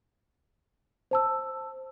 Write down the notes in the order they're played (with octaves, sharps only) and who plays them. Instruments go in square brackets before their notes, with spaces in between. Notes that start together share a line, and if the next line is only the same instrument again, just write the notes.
[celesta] C5 A5 E6